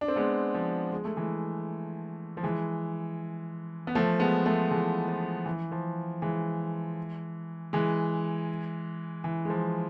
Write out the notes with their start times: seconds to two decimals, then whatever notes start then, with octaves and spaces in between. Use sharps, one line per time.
0.01 D4
0.08 C4
0.16 G#3 B3
0.54 F3
0.92 G#3
1.05 A3
1.17 E3 G#3
2.37 F3
2.43 E3 G#3
3.87 B3
3.95 F3 A3
4.20 G#3 B3
4.46 F3 A3
4.70 E3 G#3
5.08 F3
5.46 E3
5.72 F3
6.22 E3 G#3
7.73 E3 G#3
9.24 E3
9.45 G#3
9.50 F3